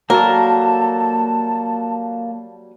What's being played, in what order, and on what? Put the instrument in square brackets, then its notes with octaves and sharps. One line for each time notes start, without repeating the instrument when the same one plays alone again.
[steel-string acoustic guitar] F#3 G3 F#4 [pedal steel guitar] A#3 A4 [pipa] A#4 [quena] A5